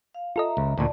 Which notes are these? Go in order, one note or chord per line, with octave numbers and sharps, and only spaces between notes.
F5
F4 A4 D#5 E5 A#5
C#2
D2 A#2 D5 A5